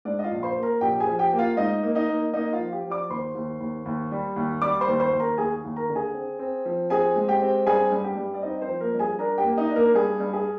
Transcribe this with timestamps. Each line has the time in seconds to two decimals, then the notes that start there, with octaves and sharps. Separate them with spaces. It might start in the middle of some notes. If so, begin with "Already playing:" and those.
0.05 G#2 D4 D5
0.19 D#5
0.24 F4 F5
0.31 A#1
0.43 C5 C6
0.57 A#3
0.63 A#4 A#5
0.81 A#1 G4 G5
1.00 G#4 G#5
1.07 F3
1.19 G4 G5
1.33 A#3
1.38 F4 F5
1.57 G#2 D#4 D#5
1.83 A#3
1.95 D#4 D#5
2.09 A#3
2.33 A#3 D#4 D#5
2.53 F4 F5
2.59 F3
2.72 G4 G5
2.84 F3
2.90 D5 D6
3.09 D#2 C5 C6
3.35 D#2
3.60 D#2
3.85 D#2
4.12 G3
4.36 D#2
4.62 G3 D5 D6
4.81 C5 C6
4.88 D#2
5.00 C5 C6
5.13 D#2
5.20 A#4 A#5
5.38 D#2 G#4 G#5
5.64 D#2
5.76 A#4 A#5
5.90 D3
5.95 G#4 G#5
6.14 C4
6.39 C4
6.65 F3
6.90 C4 G#4 G#5
7.16 G#3
7.28 G4 G5
7.42 C4
7.66 G2 G#4 G#5
7.92 G2
8.04 G4 G5
8.17 G2
8.34 D5
8.42 C4 D#4 D#5
8.61 C4 C5
8.68 F3
8.80 A#3 A#4
8.94 G2
8.99 G#4 G#5
9.19 D4 A#4 A#5
9.38 G4 G5
9.44 A#3
9.57 D#4 D#5
9.69 D4
9.76 A#3 A#4
9.94 G2 G#4
10.20 G2
10.33 G#4